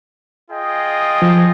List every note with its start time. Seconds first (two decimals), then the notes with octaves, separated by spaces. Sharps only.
0.49 F4 G#4 D#5 G5
1.22 F3